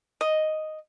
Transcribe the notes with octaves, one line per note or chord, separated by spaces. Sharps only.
D#5